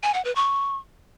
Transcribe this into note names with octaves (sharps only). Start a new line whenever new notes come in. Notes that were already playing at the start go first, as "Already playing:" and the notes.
G#5
F#5
B4
C#6